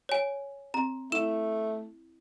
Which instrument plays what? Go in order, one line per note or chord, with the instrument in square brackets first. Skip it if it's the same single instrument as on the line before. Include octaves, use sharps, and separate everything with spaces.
[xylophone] C#5 G#5
[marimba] C4 [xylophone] A#5
[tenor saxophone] A3 [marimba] E4 [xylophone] E7